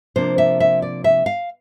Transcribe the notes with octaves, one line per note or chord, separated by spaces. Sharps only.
C3 F3 A#3 D4 C5
E5
E5
D5
E5
F5